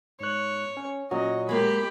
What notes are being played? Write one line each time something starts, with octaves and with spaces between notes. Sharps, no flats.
G#2 C#5 F#6
C#4
A#2 F#3 C#4 F#4 D#5
G#3 A#3 G4 B5